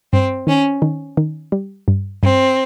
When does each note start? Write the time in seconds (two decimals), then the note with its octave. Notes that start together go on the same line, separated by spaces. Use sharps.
0.12 G2 C4
0.47 D#3 C#4
0.82 D#3
1.17 D#3
1.52 G3
1.88 G2
2.22 G2 C4